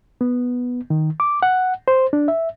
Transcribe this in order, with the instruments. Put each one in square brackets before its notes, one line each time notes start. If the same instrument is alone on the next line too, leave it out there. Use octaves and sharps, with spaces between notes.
[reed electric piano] B3
D#3
D6
F#5
C5
D4
E5